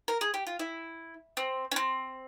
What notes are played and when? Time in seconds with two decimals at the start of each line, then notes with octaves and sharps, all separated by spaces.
0.08 A#4
0.21 G#4
0.34 G4
0.47 F4
0.59 E4
1.37 C4
1.72 C#4
1.76 C4